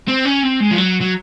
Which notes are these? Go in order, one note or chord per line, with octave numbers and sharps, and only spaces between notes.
C4
C#4
C4
G#3
F3
F#3
F#3